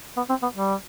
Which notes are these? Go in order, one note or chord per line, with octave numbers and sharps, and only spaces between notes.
B3
C4
B3
G3